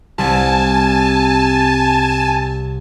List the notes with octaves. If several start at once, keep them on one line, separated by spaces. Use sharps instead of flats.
C2 G#5 A5